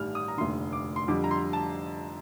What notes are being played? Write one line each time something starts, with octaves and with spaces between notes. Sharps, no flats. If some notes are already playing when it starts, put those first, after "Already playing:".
Already playing: A1 G2 D#3 G3 F6
D#6
A#5
F1 D#2 D3 C6
D6
C6
F2 D3 G3 D6
A#5
C6
A5